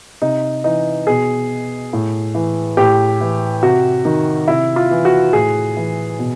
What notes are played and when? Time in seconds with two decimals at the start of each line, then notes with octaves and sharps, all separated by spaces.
0.22 C3 D#4
0.64 E3 D#4
1.07 B2 G#4
1.93 A2
2.35 E3
2.77 A2 G4
3.21 E3
3.63 C3 F#4
4.05 D#3
4.48 C3 E4
4.76 F4
4.91 E3
5.05 F#4
5.33 A2 G#4
5.77 E3
6.19 B2